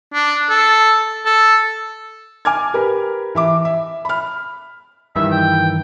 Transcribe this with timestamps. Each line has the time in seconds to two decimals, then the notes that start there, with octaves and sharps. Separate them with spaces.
0.13 D4
0.50 A4
1.26 A4
2.45 G#5 D6 F6 G#6
2.74 G4 A#4 B4
3.35 E3 E5 D6
3.65 E5
4.05 B5 F6
5.16 G2 D#3 E3 E5
5.31 G5